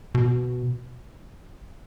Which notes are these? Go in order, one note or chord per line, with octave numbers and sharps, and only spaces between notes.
B2